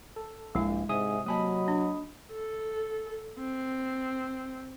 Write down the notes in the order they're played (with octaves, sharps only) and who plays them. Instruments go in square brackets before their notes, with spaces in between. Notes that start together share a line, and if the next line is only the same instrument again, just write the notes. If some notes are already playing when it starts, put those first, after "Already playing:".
[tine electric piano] A4
[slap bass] A#1 G2 [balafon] G#3 E4
[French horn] G#2 [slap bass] C3 [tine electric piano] E5 G#5 D#6
[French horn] F#3 [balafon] A#3 G#5 A5 [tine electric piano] D#5 B5 D#6
[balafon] D4
[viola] A4
C4